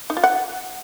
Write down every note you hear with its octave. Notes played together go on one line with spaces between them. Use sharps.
D#4
F4
F#5